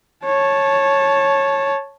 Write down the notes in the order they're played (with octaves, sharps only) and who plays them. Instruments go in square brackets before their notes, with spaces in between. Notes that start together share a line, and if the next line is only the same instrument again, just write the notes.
[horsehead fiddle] C#5 A5